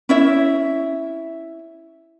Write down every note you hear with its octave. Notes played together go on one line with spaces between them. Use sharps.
C#4 E4 E5